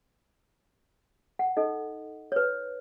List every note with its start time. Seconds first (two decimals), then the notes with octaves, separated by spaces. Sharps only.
1.39 F#5
1.57 D#4 A4 D#5
2.32 B4 C#5